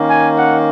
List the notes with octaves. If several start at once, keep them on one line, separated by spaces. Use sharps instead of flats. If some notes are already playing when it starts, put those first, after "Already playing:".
Already playing: D#3 A#3 C#4
G#5
F#5